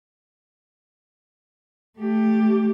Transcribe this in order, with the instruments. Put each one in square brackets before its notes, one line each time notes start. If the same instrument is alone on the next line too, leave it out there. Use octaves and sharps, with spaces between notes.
[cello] A3 G4